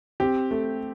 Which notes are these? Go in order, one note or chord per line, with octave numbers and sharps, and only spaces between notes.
C4 G4
A3